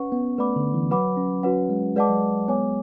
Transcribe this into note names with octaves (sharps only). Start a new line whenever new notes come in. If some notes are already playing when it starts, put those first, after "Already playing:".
Already playing: C#4 B4 F#5 C#6
B3
A3 B4 D5 F#5 B5 D6
D3
E3
F#3 B4 F#5 B5 D6
C#4
C#4 F#4 B4 F#5
G#3
G#3 B4 D5 F#5 A5 D6
F#3
B3 C#5 G#5 D6